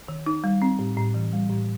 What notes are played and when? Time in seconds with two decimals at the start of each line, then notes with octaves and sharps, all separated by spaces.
0.08 D#3
0.26 D#4
0.44 G3
0.62 C4
0.79 A2
0.97 A2
1.14 E3
1.33 G3
1.50 A2